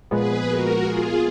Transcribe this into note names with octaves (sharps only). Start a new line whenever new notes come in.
A#2 F3 G#3 B3 G#4 B4
F#4 A#4
F4 G#4